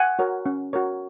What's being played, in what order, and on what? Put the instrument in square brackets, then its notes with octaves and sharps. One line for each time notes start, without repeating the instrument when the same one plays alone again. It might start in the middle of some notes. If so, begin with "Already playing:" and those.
Already playing: [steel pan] F#5 G#5
F#4 A#4 C#5
C#4
F#4 A#4 C#5